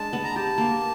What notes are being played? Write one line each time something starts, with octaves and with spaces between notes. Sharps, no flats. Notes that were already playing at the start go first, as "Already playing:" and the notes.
Already playing: G#3 D4 A5
B3
A#5
G4 A5
A#3